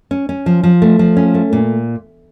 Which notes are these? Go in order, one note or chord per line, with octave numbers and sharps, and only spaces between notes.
C#4
C#4
F3
F3
A3
F3
C#4
A3
A#2